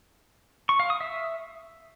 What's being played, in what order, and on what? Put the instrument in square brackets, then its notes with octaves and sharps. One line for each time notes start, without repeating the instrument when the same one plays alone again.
[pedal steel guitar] C#6
F5
D#6
E5